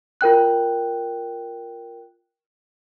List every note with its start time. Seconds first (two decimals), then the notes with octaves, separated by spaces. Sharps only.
0.21 F4 A#4 G5 F#6